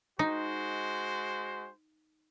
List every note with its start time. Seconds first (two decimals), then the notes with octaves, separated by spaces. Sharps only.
0.19 G#3 D#4 F#4 C5